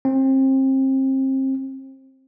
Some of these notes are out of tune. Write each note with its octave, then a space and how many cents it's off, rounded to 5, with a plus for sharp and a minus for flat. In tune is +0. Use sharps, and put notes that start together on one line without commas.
C4 +30